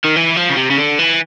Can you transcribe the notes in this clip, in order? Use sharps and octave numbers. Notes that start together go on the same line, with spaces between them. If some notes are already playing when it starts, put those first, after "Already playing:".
D#3
E3
F3
C#3
C3
C#3
D3
E3